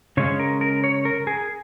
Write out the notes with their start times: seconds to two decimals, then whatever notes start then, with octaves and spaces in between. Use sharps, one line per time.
0.17 C#3 G#3 C#4 C#5
0.39 A#4
0.61 A#4
0.84 C#5
1.05 A#4
1.27 G#4